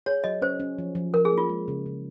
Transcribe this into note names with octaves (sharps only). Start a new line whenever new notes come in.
G#4 C#5
F#3 D#5
C#4 C5
C#4
F3
F3
F3 A#4
G#4
A#3
F4
G#3
C#3
C#3